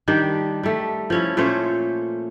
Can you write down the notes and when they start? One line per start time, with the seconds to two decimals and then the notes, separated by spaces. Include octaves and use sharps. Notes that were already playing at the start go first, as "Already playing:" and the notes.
0.08 D#3 G3 D4 G4
0.63 G3 A3
1.10 F3 C#4 E4
1.37 A#2 A3 C#4 C5